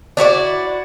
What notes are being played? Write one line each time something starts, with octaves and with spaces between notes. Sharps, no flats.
D4 E4 F#4 D5